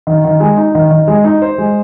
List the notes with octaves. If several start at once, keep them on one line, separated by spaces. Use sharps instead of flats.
D#3
D#3
G#3
D#4
D#3
D#3
G#3
D#4
C5
G#3